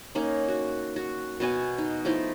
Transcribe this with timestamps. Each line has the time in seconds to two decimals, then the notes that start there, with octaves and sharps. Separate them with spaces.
0.15 A#3 C#4 D#4
0.48 F#4
0.96 F#4
1.40 B2 B3 F#4 G#5
1.78 D#4
2.05 F3 A3 D#4 E4